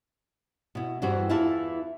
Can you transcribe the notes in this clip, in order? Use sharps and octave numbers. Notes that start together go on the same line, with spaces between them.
B2 E4
E2 G2 E3 F#4 C5
E2 E3 E4 F4 E5 A5